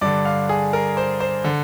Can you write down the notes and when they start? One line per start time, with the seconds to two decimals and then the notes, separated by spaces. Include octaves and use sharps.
0.01 G2 D3 D5
0.25 F5
0.49 G#4
0.73 A#4
0.97 C5
1.20 C5
1.44 D3